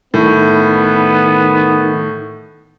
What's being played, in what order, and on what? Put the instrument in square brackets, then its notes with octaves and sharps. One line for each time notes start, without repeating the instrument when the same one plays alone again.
[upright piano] A2 [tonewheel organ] D#3 [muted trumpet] B3